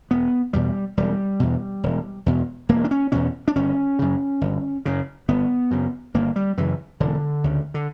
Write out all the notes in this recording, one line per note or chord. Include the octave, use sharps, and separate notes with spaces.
E1 B3
E2 B2 G3
E1 G3
E2 B2
E1
E2 B2
E1 A#3
D4
C#4
E2 B2 C#4
D4
G1 C#4
F#2 C#3
G1
F#2 C#3
G1 B3
F#2 C#3
G1 A#3
G3
F#2 C#3 E3
E1 D3
D2 C#3
D3